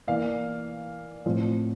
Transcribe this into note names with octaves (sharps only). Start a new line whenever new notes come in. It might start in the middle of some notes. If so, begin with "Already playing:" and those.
E3 A#3 D5 F5
A2 F3 C4